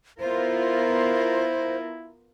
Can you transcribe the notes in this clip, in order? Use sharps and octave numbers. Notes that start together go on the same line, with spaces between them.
B3 E4 F4 A#4 C5